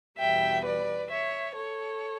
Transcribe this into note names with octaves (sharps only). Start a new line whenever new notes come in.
E2 B2 G3 E5 G5
B4 D5
C#5 E5
A4 C#5